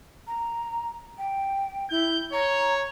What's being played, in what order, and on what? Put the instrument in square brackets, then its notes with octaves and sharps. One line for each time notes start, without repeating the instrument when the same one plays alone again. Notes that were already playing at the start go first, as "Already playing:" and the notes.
[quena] A#5
G5
[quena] E4 [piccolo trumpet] G6
[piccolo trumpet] C#5 [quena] A#5